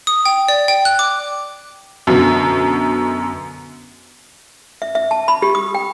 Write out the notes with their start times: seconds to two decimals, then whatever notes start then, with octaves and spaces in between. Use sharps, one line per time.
0.07 D#6
0.25 G5
0.48 D5
0.68 G5
0.85 F#6
0.99 D6
2.07 F#2 B2 D3
4.82 E5
4.95 E5
5.11 A5
5.28 B5
5.42 G4
5.55 D#6
5.75 G5